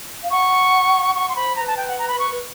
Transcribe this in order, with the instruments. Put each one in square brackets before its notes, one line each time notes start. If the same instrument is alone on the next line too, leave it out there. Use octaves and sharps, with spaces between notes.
[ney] F5
[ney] F#5 [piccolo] C#6
[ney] F#5 [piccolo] C#6
[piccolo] C6
[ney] C5 [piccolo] B5
[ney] C5 [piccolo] A#5
[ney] B4
[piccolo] A5
G5
F#5
A#5
B5
C#6
[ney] B4